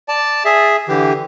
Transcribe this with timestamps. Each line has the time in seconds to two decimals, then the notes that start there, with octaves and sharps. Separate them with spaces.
0.09 D5 A5
0.45 G#4 E5
0.89 D3 E3 G4